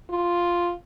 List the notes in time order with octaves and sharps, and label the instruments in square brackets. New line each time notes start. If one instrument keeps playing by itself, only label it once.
[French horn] F4